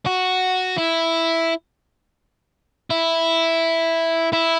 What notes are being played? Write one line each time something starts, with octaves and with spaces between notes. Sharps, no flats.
F#4
E4
E4
E4